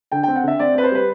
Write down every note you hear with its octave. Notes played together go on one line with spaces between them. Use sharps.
D3 G5
C4 G5
F#5
D3 E5
C4 D5
C4 B4
C5
G3 B4